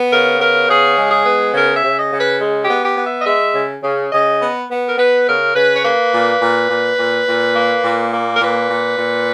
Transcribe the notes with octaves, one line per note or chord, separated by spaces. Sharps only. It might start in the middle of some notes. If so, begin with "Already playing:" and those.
Already playing: B3
C#3 A#4
B3 A#4
C#3 G#4
G#3
G#4
B3
C#3 A#4
E5
C#3
D#5
C#3
B4
G#3
G4
B3
G4
B3
E5
D#5
G#3 E5
C#3
C#3
C#3 D#5
B3
B3
A#4
B3 B4
C#3 A#4
C#3 B4
C#5
A#3 B4
A#2
A#2
A#2
A#2
A#2
A#3
A#2
A#3
A#4
A#2 B4
A#2
A#2